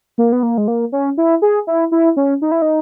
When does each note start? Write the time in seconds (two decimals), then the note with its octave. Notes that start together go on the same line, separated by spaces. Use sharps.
0.18 A#3
0.32 B3
0.43 A#3
0.58 G#3
0.68 A#3
0.92 C#4
1.18 E4
1.42 G#4
1.67 E4
1.92 E4
2.17 C#4
2.42 D#4
2.52 E4
2.62 D#4